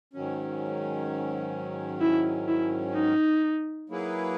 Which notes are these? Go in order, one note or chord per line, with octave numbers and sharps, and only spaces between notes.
G#2 D#3 F#3 C#4
E4
E4
D#4
F#3 A#3 E4 G#4 B4